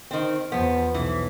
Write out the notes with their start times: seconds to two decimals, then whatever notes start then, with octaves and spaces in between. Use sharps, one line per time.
0.11 D#3 C4
0.52 E2 F3 B3
0.94 B1 E3